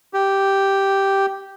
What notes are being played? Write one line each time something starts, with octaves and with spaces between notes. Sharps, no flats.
G4